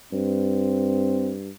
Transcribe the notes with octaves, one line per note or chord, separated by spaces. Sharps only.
G2 C4